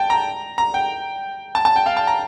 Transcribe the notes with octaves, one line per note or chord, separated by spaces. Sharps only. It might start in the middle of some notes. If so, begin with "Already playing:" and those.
Already playing: G5 A5
A#5
A#5
G5
A5
A5
G5
F5
A5
A#5